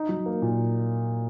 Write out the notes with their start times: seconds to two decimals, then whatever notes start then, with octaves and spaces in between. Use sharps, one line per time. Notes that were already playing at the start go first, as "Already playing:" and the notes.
Already playing: D#4
0.09 F#3
0.26 A#3
0.42 A#2